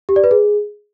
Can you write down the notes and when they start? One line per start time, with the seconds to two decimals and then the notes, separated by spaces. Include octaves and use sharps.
0.09 G4
0.16 D5
0.24 B4
0.31 G#4